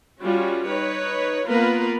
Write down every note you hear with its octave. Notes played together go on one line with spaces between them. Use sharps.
G3 C#4 F4 F#4
D#4 B4 C#5
A#3 B3 F4 A#4 B4